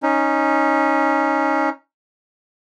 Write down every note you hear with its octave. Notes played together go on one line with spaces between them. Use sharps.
C#4 D#4